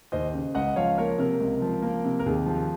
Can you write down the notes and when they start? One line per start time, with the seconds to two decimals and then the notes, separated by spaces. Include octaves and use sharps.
0.12 D#2 C5 D#5
0.34 C#3
0.55 C#2 D#5 F#5
0.76 F3 C#5 F5
0.98 A#3 A#4 C#5
1.18 C3 A#4
1.40 C#2
1.62 F3
1.82 A#3
2.05 C3
2.20 A#4
2.26 D#2 G#4
2.46 F3